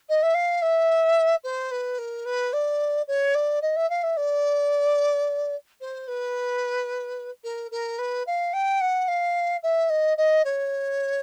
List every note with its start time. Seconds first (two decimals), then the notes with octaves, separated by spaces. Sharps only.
0.09 D#5
0.23 E5
0.34 F5
0.62 E5
1.44 C5
1.71 B4
1.98 A#4
2.26 B4
2.53 D5
3.08 C#5
3.35 D5
3.62 D#5
3.76 E5
3.90 F5
4.03 E5
4.17 D5
5.81 C5
6.08 B4
7.44 A#4
7.71 A#4
7.99 B4
8.27 F5
8.53 G5
8.81 F#5
9.08 F5
9.63 E5
9.90 D#5
10.18 D#5
10.45 C#5